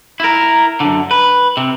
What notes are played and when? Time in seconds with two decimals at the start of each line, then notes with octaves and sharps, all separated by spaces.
0.20 E4 A#4
0.80 F#2 D3
1.11 B4
1.57 C3